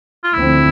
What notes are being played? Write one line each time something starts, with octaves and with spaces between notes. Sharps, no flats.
F4
D2 D3 F3 C4 E4